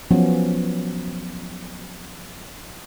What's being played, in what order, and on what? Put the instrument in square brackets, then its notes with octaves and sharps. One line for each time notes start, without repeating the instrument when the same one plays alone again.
[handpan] F3 F#3 B3 C#4